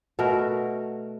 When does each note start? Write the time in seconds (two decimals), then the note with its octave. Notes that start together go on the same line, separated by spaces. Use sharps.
0.19 B2 A3 F#4 A#4